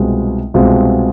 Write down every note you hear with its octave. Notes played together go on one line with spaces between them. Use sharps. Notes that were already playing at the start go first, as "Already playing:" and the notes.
Already playing: C2 B2 G#3 C4 F4
C2 B2 G#3 C4 F4